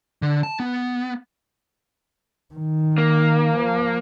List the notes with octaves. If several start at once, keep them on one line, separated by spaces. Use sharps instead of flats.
D3
A5
B3
D#3
A#3
F3